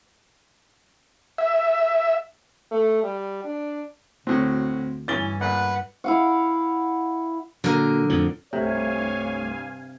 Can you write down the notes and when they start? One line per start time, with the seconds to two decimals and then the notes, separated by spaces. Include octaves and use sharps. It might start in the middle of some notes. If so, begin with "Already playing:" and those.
1.38 E5
2.71 A3
3.03 G3
3.44 D4
4.27 D2 A2 F#3 C4
5.08 G2 E3 C#4 A6 G7
5.41 B1 A#2 B4 F#5
6.04 E4 F5 F#5
7.64 A#2 D3 F#3 A#4
8.09 F2 A2 F3
8.53 C2 G2 C3 A3 C#5 F5 G#5